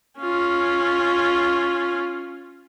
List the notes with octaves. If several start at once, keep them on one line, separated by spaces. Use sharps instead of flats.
C#4 F4